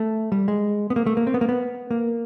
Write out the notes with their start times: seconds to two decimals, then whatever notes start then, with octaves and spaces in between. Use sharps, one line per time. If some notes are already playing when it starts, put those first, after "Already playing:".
Already playing: A3
0.32 G3
0.48 G#3
0.90 B3
0.96 A#3
1.06 A3
1.17 A#3
1.27 C4
1.34 B3
1.41 A#3
1.49 B3
1.91 A#3